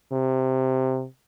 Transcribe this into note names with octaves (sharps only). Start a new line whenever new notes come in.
C3